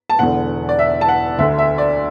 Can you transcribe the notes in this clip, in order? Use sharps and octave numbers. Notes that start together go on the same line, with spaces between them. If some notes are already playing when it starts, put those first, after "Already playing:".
A5
E1 E2 D3 F#5
D5
E5
A5
F#5
D2 D3 E5
E5
D5